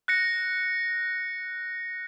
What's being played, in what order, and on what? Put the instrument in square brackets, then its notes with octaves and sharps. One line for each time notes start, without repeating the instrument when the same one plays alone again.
[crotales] F#6 A#6 C#7